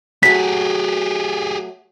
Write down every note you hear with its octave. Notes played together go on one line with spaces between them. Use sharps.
F#3 A3 G4 G#4 B6